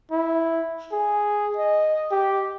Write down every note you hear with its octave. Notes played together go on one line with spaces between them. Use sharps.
E4
G#4
D#5
G4